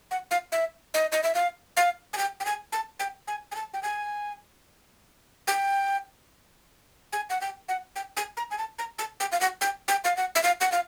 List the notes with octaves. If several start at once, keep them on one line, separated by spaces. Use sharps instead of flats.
F#5
F5
E5
D#5
D#5
E5
F5
F5
G#5
G5
G5
G#5
A5
G5
G#5
G#5
A5
G5
G#5
G5
G#5
F#5
G5
F#5
G5
G#5
A#5
G#5
A5
A#5
A5
G5
F5
F#5
G5
G5
F5
F#5
E5
F5
F#5
F5